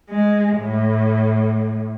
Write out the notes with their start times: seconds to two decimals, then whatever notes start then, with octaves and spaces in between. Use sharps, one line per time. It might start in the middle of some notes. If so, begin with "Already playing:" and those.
0.10 G#3
0.58 A2